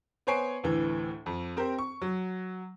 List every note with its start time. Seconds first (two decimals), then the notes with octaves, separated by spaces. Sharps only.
0.27 B3 C5 C#5 G#5 C7 D7
0.64 D2 A2 E3
1.26 F2
1.57 C4 G4 A#4 C5
1.79 C#6
2.02 F#3